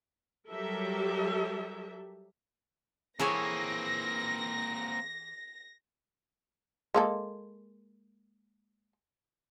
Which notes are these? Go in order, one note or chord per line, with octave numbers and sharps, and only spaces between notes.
F#3 G3 G4 A4 A#4 E5
E3 A#3 C4 G#4 A4 C#5 G#5 A#6
G#3 A#3 A4